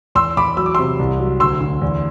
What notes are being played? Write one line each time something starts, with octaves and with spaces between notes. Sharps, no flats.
E2 C6 E6
E2 B5 D6
F#3 E6
D6
C3 C6 E6
C2
F#3
D2 C6 E6
D2
E2